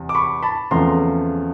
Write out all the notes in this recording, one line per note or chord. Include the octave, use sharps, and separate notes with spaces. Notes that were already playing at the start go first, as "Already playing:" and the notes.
Already playing: E2 C3
D6
B5 C#6
A5 B5
E2 C#3 F3 A3 C4 A#5 C6